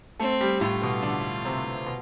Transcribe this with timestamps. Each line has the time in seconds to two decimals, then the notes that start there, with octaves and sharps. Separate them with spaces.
0.20 A3 C4 A4
0.41 G3 G4
0.61 A2 A3 F4
0.82 B2 B3
1.03 D3 D4
1.45 C3 C4
1.86 B2